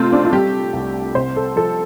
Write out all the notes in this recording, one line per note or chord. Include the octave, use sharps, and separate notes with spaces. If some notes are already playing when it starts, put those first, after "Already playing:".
Already playing: C3 A3 C4 F4
D4
F4
G3 G4
C2
C3 C5
A4
F3 A4